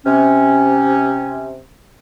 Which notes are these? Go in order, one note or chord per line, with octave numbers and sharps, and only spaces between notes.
C3 C#4